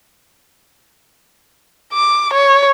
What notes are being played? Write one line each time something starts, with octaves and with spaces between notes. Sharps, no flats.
D6
C#5